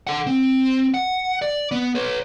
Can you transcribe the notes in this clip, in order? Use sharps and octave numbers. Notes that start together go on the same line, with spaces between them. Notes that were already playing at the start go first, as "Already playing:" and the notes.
A4 F#5
C4
F#5
D5
B3
B4 C#5